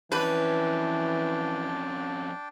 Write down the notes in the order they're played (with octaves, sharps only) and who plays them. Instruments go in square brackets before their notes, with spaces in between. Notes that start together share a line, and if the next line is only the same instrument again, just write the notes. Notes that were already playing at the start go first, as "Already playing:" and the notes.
[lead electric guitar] F2 C#4 [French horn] E3 [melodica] D4 G5 A5 [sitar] B4